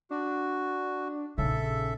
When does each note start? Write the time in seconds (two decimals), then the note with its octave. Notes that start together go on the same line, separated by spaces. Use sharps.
0.11 D4 F#4
1.38 A#1 C#3 D#4 A4 E5